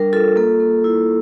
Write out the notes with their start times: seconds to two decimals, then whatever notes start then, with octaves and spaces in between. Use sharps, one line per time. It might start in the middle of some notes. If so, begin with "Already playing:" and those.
Already playing: G3 D4 A#4
0.13 F4 A4
0.36 A#3 A4
0.60 A#3
0.84 E4